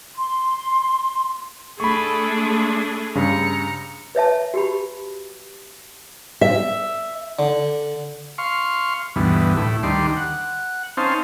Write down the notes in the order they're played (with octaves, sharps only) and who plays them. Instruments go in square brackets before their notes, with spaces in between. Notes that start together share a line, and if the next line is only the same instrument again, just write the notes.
[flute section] C6
[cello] A3 D4 [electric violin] G#4 A4 [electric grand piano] B5 C#6
[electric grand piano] G2 C#3 [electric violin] A#5 C#7
[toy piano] B4 C#5 E5 A5
F#4 G4 B5
[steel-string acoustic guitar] E5
[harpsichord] D3
[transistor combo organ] F5 C6 C#6
D2 G2 B2 E3
A2 E4
D2 D#3 G3 D5 C6
F#5
C4 C#4 D#4 C5 F5 A5